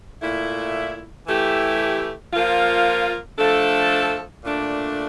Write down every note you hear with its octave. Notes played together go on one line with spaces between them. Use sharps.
A#2 A3 E4
E3 A3 E4 G4
F3 A#3 F4
F3 A3 D4 A4
A#2 A3 D4